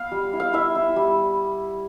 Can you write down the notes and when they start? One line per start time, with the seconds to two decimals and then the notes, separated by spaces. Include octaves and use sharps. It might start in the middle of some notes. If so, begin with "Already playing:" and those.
Already playing: B3 F5
0.11 G3
0.33 E4
0.40 F5
0.53 E4 E5
0.75 E4
0.96 G3